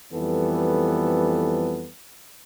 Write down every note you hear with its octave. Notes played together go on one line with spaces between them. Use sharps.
F2 E3 G3 B3 A4